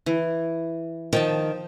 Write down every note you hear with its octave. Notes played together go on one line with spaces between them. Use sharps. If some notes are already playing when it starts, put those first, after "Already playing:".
E3
D#3 F3 G5 A5